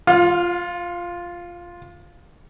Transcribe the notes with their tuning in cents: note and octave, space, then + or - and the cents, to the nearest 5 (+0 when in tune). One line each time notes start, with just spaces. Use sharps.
F4 +0 F5 +40